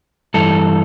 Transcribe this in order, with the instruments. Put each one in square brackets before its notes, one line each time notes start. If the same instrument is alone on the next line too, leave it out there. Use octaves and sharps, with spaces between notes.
[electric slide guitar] G2 E3 A4